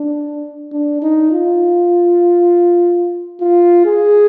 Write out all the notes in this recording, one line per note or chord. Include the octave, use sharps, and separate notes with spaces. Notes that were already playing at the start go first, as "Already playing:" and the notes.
Already playing: D4
D4
D#4
F4
F4
G#4